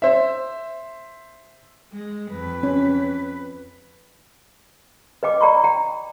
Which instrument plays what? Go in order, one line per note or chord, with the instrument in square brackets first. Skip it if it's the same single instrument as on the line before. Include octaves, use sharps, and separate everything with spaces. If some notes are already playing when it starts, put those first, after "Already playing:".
[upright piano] C5 E5
[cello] G#3
F2 B4
[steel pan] C#4
[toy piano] B4 D#5 G5 D6
D5 G5 A#5 B5 C#6
G5 A#5